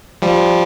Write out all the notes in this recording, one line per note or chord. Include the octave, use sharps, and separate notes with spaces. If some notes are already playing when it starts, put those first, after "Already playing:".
F3 G3